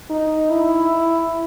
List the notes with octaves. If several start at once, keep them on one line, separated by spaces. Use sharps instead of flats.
D#4
E4